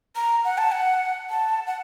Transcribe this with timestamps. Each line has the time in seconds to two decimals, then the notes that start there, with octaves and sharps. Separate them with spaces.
0.16 A#5
0.45 F#5
0.58 A5
0.72 F#5
1.30 A5
1.67 F#5